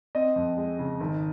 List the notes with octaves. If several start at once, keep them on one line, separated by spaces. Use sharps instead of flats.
C4 D#5
F2
G#3
C#3
G#1